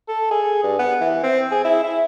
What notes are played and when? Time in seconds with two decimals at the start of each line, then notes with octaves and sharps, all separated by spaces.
0.08 A4
0.31 G#4
0.63 G2
0.79 B3
1.01 E3
1.23 C4
1.51 G#4
1.65 E4
1.84 E4